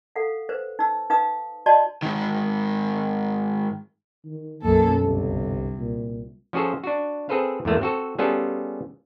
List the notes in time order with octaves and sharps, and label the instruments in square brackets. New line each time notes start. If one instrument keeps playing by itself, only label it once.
[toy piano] A4 F5 F#5
B4 C5
D#4 E6
D#4 B4 F5 D#6
F#4 D5 D#5 A5 C6
[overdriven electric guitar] G#2 D#3
[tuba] D#3
[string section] B1 F#2 A4 [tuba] A#3
[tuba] G1 [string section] C2
[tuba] A#2
[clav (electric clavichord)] F3 C#4 F#4 G#4 A4 C5
D4 F#4
C4 G#4 A4 B4 C5 F5
E2 G#2 A3 A#3
C4 F#4 A4
G3 B3 C#4 F4 G#4 A4